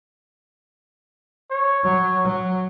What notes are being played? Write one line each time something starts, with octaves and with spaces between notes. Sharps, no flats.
C#5
F#3
F#3